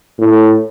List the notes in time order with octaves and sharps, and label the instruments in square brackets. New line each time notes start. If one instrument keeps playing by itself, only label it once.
[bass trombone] A2